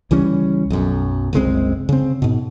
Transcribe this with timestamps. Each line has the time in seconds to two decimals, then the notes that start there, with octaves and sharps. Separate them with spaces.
0.11 C#2 E3 G3 C#4
0.70 B1 F#2
1.33 F#1 C2 G#3 C4
1.89 C#3 C4
2.22 G#2 B2